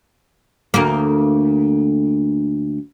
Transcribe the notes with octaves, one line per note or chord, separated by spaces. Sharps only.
D2 A#3